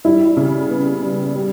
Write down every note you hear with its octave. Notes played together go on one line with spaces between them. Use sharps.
G3 E4
C#3
B3
G3
G3